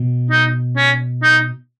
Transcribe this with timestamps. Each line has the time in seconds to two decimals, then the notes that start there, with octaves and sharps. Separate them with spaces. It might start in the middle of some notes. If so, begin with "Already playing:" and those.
Already playing: B2
0.31 D#4
0.77 C#4
1.23 D#4